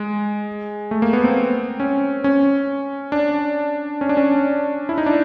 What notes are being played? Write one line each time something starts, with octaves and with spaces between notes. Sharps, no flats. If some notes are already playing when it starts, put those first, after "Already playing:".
Already playing: G#3
A3
A#3
B3
C4
C#4
C#4
D4
C#4
D4
C#4
E4
D#4
D4